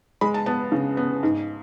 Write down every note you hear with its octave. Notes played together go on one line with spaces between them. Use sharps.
G#3 B5
A5
B3 A5
C#3
B3
G#2